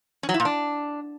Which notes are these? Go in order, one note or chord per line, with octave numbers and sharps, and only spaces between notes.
C#4
F#3
E4
A#2
D4